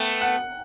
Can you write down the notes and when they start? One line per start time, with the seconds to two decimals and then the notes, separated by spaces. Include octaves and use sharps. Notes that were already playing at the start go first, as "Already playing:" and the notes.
Already playing: A3 B3 G5
0.21 F#5